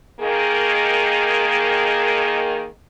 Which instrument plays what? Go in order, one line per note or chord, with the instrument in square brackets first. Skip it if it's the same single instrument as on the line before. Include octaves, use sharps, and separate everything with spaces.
[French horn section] D#3 A#3 G#4